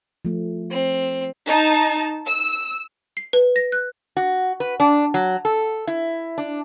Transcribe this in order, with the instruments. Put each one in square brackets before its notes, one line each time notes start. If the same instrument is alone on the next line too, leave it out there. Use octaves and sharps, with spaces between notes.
[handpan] F3 A3
[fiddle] C4
[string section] D#4 A5
E6
[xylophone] C7
B4
A#6
F#6
[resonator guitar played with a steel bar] F#4
B4
D4
F#3
A4
E4
D4